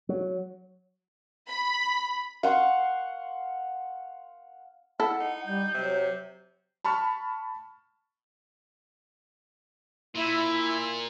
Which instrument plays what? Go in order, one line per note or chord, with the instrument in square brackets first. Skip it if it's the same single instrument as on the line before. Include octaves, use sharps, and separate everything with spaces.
[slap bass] F#3
[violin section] B5
[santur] F5 F#5 C6 C#6
[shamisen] E4 A4 [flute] F#5
[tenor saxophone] D#4
[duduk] G3 [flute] G6
[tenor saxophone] C3 [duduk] F#3
[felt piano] A5 B5 C#6 F6
[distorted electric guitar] A#2 [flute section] E4